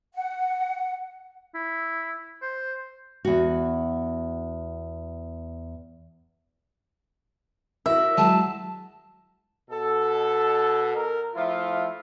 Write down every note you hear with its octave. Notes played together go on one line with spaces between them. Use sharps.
F#5
E4
C5
E2 F#4
E4 F#4 A#4 E5
F#3 G#3 A5
B2 A4
A#4
F3 A3 E4 F4